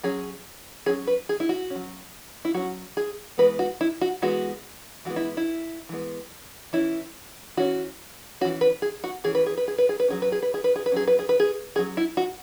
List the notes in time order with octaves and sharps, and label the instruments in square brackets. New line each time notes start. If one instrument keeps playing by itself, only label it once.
[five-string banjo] F#3 C#4 G#4
F#3 C#4 G#4
B4
G#4
E4
F#4
C#4
F#3
E4
F#3 C#4 F#4
G#4
E3 G#3 B3 B4
F#4
E4
F#4
E3 G#3 B3 F#4
E3 G#3 B3 F#4
E4
E4
E3 G#3 B3
E3 C#4 E4
E3 C#4 F#4
C#4 F#4
E3
B4
G#4
F#4
E3 C#4 G#4
B4
G#4
B4
G#4
B4
G#4
B4
F#3 C#4 G#4
B4
G#4
B4
G#4
B4
G#4
B4
F#3 C#4 G#4
B4
G#4
B4
G#4
C#4 G#4
F#3
E4
F#4